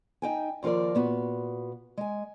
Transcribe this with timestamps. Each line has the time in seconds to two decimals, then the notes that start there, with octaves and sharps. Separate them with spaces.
0.22 D#4 G5 G#5
0.63 D#2 F3 F4 A#4 D5
0.95 A#2 B3 F#4
1.98 G#3 G#5